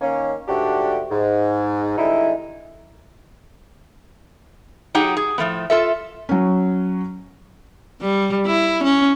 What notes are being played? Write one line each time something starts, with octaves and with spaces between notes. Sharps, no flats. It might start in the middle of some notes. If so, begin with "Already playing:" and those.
D#3 A#3 C#4
G#2 D3 A3 D4 F#4 G4
G#2
D3 G3 G#3 D#4 E4
F#3 D#4 G4 G#4 F#5
G#4
A2 F3 A3 B3
F4 A4 E5
F#3 C#4
G3
E4
C#4